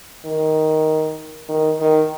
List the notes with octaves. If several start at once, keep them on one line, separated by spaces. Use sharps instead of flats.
D#3
D#3
D#3